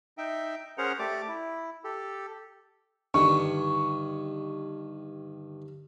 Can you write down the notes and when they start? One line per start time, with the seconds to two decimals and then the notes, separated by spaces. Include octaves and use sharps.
0.18 D#4 E5 G5
0.78 C#4 G#4 A#4 C5 F#5 A#5
0.99 A3 G4 D5 D6
1.28 E4
1.84 G4 A4
3.14 G2 D3 D#3 G4 C#6